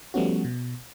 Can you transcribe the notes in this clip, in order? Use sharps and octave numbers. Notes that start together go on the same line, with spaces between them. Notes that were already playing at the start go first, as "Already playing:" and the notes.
F3 G3 A3 B3 C#4 F#4
B2